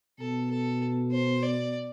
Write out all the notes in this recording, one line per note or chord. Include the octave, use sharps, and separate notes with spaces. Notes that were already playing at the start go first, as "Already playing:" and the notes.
B2 A4
A4
C5
D5